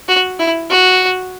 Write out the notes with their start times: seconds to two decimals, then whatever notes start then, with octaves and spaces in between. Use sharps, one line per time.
0.08 F#4
0.40 E4
0.70 F#4